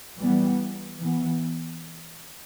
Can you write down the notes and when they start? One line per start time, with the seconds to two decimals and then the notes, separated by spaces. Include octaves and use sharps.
0.18 E3 G3 B3
0.99 E3 B3